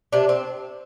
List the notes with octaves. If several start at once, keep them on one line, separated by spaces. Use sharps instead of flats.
C3 D4
C4